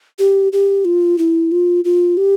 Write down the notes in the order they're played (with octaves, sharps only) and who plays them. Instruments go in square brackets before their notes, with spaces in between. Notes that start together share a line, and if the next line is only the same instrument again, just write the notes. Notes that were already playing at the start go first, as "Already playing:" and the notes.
[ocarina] G4
G4
F4
E4
F4
F4
G4